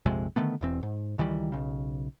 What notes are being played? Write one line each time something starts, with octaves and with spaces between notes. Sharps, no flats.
A#1 F2 C3 G#3
D3 D#3 A3 B3
E1 E2 C4
G#2
C#2 D#3 E3 G3
B1 C#3